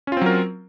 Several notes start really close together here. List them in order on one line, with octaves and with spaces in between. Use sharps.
C#4 F4 C4 F#3 A#4